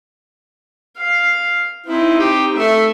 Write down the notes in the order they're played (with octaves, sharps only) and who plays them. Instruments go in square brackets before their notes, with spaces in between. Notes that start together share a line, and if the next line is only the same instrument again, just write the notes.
[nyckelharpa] F5
[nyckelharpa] C4 D#4 [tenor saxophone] E4
[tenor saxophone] G4
[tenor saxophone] A3 [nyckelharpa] E5